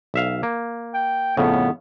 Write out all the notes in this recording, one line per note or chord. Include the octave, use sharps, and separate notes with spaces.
B1 E5 F5
A#3
G5
F2 A2 C#3 B3